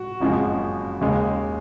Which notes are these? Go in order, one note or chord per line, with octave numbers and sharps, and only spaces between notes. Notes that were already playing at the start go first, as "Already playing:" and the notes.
Already playing: F#4
F#1 F2 C#3 F3 G#3
D#2 C#3 G#3